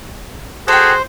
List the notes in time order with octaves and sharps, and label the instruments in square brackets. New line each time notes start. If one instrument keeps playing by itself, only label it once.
[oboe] F#4 [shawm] G#4 [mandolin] A4 G5 [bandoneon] C5